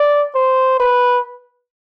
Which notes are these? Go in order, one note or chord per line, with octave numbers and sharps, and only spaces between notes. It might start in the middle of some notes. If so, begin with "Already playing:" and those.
Already playing: D5
C5
B4